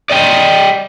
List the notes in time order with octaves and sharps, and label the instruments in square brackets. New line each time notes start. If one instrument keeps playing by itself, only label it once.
[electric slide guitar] D5 D#5 G5